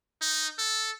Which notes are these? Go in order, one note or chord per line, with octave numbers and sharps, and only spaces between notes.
D#4
A4